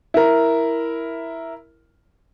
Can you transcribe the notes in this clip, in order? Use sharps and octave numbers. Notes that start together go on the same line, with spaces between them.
E4 A#4